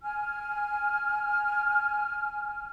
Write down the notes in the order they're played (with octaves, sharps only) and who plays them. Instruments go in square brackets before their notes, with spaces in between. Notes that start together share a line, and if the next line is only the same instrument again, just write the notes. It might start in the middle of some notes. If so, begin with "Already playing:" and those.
[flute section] G#5 F6